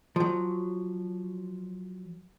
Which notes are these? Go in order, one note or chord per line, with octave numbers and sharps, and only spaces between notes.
F3 F#3